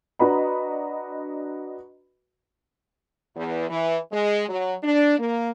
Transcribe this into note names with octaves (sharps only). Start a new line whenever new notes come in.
D4 F#4 B4 D#5 A#5 B5
E2
E3
G#3
F#3
D4
A#3